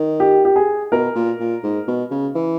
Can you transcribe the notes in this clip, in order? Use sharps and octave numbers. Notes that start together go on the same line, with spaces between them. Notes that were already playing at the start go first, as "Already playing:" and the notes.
Already playing: D#3
G4
G4
G#4
B2 A#4
A#2
A#2
G#2
B2
C#3
E3